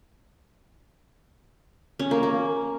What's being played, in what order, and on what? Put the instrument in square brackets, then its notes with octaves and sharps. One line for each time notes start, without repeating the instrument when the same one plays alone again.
[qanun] C#4
A#3
A#3